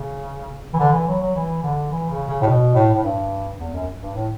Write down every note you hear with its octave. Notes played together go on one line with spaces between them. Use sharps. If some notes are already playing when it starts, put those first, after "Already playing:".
Already playing: C#3
E3
D3
E3
F#3
F#3
E3
D3
E3
C#3
C#3
A2
B2
A2
A2
G2
E2
F#2
G2
A2